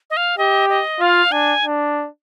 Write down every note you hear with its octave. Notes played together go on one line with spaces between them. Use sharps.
D#5
F5
G4 D#5
D#5
F4 F5
D4 G#5
D4